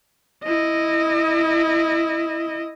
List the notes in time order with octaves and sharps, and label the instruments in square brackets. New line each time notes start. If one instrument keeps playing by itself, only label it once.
[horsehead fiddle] E4 D#5